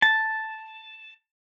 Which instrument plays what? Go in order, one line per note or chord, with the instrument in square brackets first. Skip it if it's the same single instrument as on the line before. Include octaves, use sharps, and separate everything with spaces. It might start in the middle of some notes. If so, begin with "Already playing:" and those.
[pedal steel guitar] A5